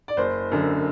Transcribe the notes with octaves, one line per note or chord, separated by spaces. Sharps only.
D5
F#1 C5
F#2 D3